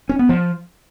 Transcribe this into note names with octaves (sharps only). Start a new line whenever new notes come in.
C#4
B3
F3